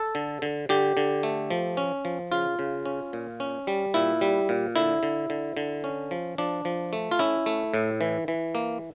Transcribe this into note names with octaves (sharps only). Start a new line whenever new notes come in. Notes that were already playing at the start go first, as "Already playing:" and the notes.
Already playing: A4
D3
D3
D3 G4
D3
A3
F3
C#4
F3
C#3 F4
C#3
C#4
A#2
C#4
G3
A#2 E4
G3
A#2
D3 E4
D3
D3
D3
C#4
F3
F3 D4
F3
A3
F4
C#4 E4
A3
A2
E3
E3
A#3